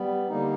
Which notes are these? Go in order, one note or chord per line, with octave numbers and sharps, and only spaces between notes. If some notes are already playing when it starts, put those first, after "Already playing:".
Already playing: G3 B3
D3 G3 A#3 D#4